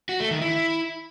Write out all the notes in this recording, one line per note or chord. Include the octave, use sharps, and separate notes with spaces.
F#4
A3
D#3
E4